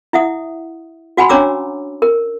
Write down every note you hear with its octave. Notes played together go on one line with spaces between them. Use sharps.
E4 E5 F#5 D#6
F#4 F#5 G#5 B5 C6
C#4 D4 C#5 A#5 D6 E6
A#4